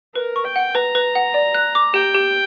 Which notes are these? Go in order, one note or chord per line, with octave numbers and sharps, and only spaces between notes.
A#4 B4
C#6
G5
F#5
B4 A#5
B4
F#5
D5
F#6
D6
G4 G5
G4